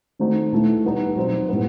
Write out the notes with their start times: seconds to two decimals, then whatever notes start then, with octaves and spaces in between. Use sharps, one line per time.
0.19 D#3 A3 C4 D#4 F#4
0.52 B2 A3 E4
0.84 G3 B3 D#4
1.16 B2 F#3 C4 D#4
1.49 A2 G3 B3